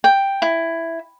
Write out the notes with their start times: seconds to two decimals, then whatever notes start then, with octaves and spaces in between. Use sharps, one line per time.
0.04 G5
0.42 E4